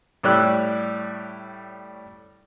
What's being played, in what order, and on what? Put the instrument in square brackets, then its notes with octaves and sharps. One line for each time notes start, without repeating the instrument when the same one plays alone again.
[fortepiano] A2 G3 C#5 G5 E6 F#6